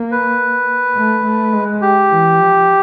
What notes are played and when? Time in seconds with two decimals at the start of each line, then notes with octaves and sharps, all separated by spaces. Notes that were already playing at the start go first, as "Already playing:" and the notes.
Already playing: A#3
0.11 B4
0.96 A3
1.24 A3
1.52 G#3
1.81 G4
2.09 E3
2.38 F3